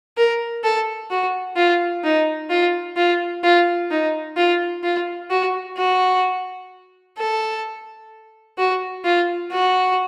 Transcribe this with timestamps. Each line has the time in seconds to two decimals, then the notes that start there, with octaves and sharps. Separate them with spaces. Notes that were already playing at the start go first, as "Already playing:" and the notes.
0.17 A#4
0.64 A4
1.11 F#4
1.57 F4
2.04 D#4
2.50 F4
2.97 F4
3.43 F4
3.91 D#4
4.37 F4
4.84 F4
5.30 F#4
5.78 F#4
7.18 A4
8.58 F#4
9.04 F4
9.52 F#4